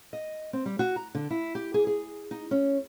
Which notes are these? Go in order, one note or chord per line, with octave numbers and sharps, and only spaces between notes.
D#5
C4
G3
F#4
A#5
D3
E4
G4
G#4
G#4
D#4
C#4